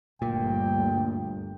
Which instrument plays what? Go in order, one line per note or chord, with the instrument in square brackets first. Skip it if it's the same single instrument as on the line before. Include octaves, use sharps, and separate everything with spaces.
[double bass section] G1 D2 [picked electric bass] A#2 [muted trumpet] G5